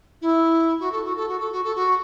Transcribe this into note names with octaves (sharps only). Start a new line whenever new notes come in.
E4
F#4
A4
F#4
A4
F#4
A4
F#4
A4
F#4